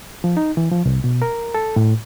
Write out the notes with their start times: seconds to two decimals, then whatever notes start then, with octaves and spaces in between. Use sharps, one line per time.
0.24 F3
0.37 D#4
0.57 E3
0.71 F3
0.85 C2
1.04 B2
1.22 A#4
1.55 A4
1.76 A2